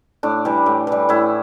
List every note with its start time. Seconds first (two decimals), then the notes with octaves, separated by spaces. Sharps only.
0.23 A2 D4
0.45 E3 G3
0.66 A2
0.87 E3 G3
1.09 A2 E4